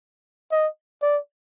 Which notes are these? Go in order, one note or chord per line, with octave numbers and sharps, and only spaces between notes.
D#5
D5